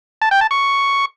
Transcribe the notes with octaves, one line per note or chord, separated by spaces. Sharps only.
A5
G5
A5
C#6